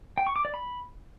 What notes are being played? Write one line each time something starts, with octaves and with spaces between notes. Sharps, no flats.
G5
C#6
D6
D5
B5